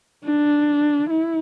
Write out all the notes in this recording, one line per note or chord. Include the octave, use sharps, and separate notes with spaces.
D4
E4